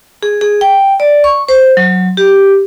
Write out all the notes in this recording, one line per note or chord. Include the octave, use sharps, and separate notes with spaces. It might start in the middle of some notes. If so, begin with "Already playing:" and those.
G#4
G#4
G5
D5
C#6
C5
F#3
G4